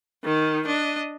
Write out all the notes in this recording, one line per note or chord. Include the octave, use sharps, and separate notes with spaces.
D#3 D#4
D4 D#5